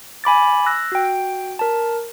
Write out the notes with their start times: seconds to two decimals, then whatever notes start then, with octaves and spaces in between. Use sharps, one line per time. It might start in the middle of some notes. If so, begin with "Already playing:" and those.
0.24 G#5 B5 D6 A6
0.66 E6 F#6 A#6
0.92 F#4 G5
1.59 A#4 A5